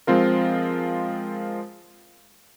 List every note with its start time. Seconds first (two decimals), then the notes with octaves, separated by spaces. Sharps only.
0.07 F3 G#3 C4 F4 A#4